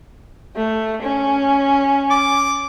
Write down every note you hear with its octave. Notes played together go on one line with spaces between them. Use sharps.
A3
C#4
D6